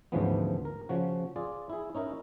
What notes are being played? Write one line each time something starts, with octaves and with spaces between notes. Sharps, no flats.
D2 G#2 C#3 E3 F3 B3
A#4
C#3 F3 F#4
F4 G#4 D5
E4 G#4
C#4 D#4 E4 A#4